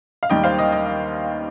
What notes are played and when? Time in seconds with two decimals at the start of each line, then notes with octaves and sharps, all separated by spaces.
0.23 F5
0.30 D#2 D#3 G3 D#5 G5
0.44 C5 F5
0.59 D#5
0.72 D#5
0.86 D#5